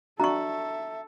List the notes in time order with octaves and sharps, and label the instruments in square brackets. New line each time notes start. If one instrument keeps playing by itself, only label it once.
[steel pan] D4 F#4 [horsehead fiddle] A4 [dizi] E5 [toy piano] A#5 C#6